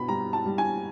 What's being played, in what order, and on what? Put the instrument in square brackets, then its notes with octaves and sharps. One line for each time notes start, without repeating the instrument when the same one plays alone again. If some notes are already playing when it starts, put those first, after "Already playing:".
Already playing: [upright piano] B2 B5
G3 A#5
A5
G3
G#5